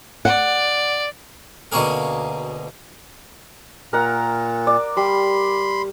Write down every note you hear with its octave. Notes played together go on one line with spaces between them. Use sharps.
D5 F#5
D2 B2 A#3 C#4 G#4 A#4
A#2 A#4 F#5
D5
G3 B5 C6